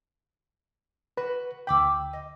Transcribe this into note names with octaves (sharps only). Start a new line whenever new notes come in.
F#4 B4
D2 G5 B5 D6 E6
D#5